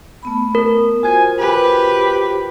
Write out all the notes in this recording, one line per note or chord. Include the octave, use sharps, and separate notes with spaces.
A3 B3 B5
A#4
F4 F#4 C5 G#5
G4 B4